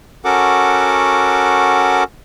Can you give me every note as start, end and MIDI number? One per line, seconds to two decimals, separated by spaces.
0.25 2.04 61
0.25 2.04 66
0.25 2.04 69
0.25 2.04 70
0.25 2.04 78
0.25 2.04 86